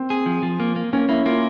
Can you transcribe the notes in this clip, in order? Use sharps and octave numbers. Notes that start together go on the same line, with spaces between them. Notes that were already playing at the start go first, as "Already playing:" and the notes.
Already playing: C4
G#4
F3
F3
A#3
A#3
A#3 C#4
A#3 E4
A#3 F4